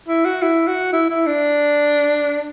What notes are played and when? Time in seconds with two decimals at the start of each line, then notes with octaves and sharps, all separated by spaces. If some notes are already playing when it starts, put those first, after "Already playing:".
0.08 E4
0.25 F#4
0.42 E4
0.67 F#4
0.93 E4
1.10 E4
1.26 D4